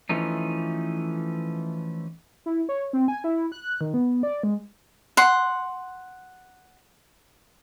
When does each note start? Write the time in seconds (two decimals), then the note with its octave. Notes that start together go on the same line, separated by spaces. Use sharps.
0.09 E3 F3 A3 C#4 D#4
2.46 E4
2.69 C#5
2.93 C4
3.08 G#5
3.24 E4
3.52 F#6
3.81 D#3
3.94 B3
4.23 D5
4.43 G#3
5.17 F#5 C6